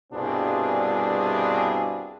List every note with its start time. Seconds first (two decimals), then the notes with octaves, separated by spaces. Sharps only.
0.13 C2 G2 B2 C4 D4 G#4